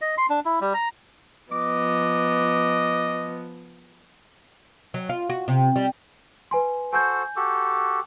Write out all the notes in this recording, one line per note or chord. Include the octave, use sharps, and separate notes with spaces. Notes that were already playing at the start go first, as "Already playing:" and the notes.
D#5
C6
D4
E4
G3
A#5
F3 B3 D#5 D6
F#3
F4
F#4
C3
G3
B4 G#5 C6
F#4 A4 C5 G#5 G6
F#4 G4 A4